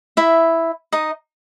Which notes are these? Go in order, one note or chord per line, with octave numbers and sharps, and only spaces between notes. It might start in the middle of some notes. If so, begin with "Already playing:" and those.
E4 E5
D#4 D#5